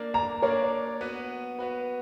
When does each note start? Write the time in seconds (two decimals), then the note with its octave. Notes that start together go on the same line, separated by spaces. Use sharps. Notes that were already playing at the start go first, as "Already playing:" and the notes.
Already playing: A#3 D4 A#4 D5
0.14 A#5
0.42 A#3 D4 A#4 C#5 D5
1.01 B3 F#4 B4
1.59 B3 F#4 B4